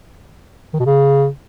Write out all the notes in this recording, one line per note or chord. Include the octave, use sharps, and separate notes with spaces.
D#3
B2
C#3